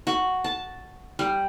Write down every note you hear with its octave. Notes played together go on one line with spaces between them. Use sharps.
F#4
A5
G3